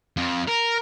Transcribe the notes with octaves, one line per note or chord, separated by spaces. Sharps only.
F2
A#4